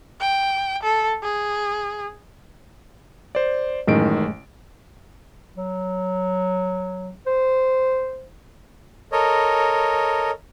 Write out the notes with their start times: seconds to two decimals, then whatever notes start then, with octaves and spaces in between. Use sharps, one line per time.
0.20 G5
0.83 A4
1.23 G#4
3.35 C5 D5
3.87 A1 F#2 A2 D#3 G#3 D7
5.58 F#3
7.27 C5
9.12 A4 A#4 C#5 D#5